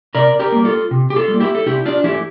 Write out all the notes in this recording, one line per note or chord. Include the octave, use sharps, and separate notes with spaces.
C3 A#4 D5
G4 A#4
G3 A#3
F4 A4
C3
G4
F4 A4
G3 A#3
E4 G4
A4
C3 E4 G4
D4 F4
E3 A3 E4 G4